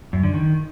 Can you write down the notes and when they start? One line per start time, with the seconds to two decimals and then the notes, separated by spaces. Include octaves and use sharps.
0.13 F#2
0.23 D3
0.34 D#3